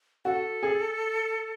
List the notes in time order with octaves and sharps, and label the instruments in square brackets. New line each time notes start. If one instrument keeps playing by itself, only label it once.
[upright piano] F#4 [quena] A4
[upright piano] G#4